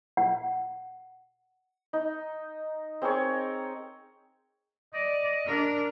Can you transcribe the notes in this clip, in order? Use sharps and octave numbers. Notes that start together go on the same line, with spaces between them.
F#5
D#4
C4 G#4 A#4 C#5
D5 D#5
D4 A#4